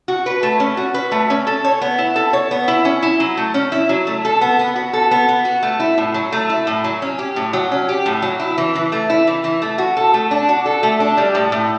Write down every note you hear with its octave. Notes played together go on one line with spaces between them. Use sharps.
F#4
B4
A3
C#4
F#4
B4
A3
C#4
A4
C#5
B3
E4
A4
C#5
B3
E4
C#4
E4
F#3
A3
C#4
E4
F#3
A3
A4
B3
B3
F#4
A4
B3
B3
F#4
A3
E4
A2
F#3
A3
E4
A2
F#3
C#4
G4
A2
F#3
C#4
G4
A2
F#3
E4
E3
E3
A3
E4
E3
E3
A3
F#4
A4
A3
D4
F#4
A4
A3
D4
G3
A2
A2